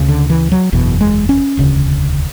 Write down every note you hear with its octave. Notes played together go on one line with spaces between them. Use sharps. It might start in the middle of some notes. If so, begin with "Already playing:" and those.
Already playing: D2 C#3
D3
E3
F#3
F#1 E2 B2
G#3
C#4
E1 D2 C#3